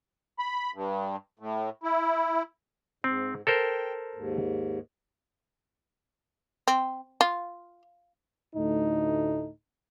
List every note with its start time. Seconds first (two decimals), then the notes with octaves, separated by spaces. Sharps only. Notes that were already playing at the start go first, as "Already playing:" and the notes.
0.39 B5
0.74 G2
1.39 A2
1.83 E4
3.04 G#2 C4
3.47 A4 A#4 C5 G5
4.15 D#2 G#2
6.68 C4
7.21 F4
8.56 D2 A2 A3 D#4